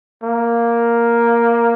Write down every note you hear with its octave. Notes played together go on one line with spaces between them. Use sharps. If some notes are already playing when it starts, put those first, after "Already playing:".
A#3